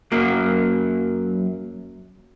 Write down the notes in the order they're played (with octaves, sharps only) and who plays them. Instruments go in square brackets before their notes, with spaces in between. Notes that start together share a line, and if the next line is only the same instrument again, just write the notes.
[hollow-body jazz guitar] F#2 F#3 A#3